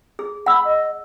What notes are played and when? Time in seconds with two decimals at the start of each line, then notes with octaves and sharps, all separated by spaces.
0.19 G#4
0.46 F#5 B5 E6
0.64 D#5